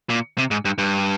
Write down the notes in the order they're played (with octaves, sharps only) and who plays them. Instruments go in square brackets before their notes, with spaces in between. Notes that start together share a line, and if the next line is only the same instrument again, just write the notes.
[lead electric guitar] A#2
C3
G#2
G2
G2